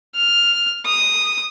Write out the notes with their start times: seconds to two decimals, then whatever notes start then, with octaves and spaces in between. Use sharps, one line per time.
0.15 F6
0.85 D#6